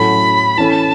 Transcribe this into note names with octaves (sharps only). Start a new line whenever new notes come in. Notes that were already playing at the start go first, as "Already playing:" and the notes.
Already playing: A2 F#3 A3 C#4 B5
E3 C#4 A4 A5